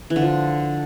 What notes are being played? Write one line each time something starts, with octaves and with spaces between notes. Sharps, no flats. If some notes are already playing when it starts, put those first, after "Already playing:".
E3
D3
F3